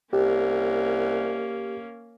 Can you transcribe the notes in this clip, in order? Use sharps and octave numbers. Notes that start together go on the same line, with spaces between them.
C2 A#3 C#4 G4